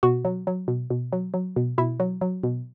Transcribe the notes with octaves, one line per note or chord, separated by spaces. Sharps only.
B2 F#4
F#3
F#3
B2
B2
F#3
F#3
B2
B2 E4
F#3
F#3
B2